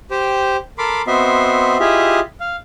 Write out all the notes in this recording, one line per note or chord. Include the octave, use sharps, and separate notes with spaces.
G4 C5 G5
A4 A#4 B5 C6 D6
B3 C4 F#4 D#5 E5 C6
E4 F4 G4 G#4 D#5 E5
F5